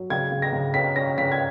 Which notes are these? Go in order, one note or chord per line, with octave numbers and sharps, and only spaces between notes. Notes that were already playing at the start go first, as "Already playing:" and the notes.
Already playing: F#3
C#3 G#6
C#3
A#6
C#3
C#4 B6
C#4 A#6
C#3 B6
G#6